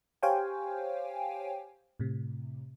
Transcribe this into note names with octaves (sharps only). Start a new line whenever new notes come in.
G4 C5 C#5 F5 G5 G#5
A2 C3